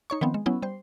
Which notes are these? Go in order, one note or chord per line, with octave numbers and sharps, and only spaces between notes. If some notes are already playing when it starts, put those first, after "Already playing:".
D#4 C#5 C#6
D#3 F3 B3 C4
G#3
F#3 B3 C#4 E4
G3 C5